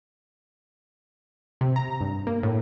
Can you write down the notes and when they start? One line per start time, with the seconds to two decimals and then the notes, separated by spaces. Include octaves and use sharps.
1.61 C3
1.76 A#5
2.01 G2
2.27 A#3
2.43 A2